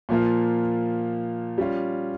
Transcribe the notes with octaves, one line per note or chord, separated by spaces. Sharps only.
A#2 F3 A#3 F4
G3 C#4 F4